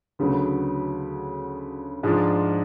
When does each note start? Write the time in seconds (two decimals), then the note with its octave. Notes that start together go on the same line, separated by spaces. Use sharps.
0.19 D2 C#3 F#3 B3
2.03 G#2 F3 G#3 D4 F4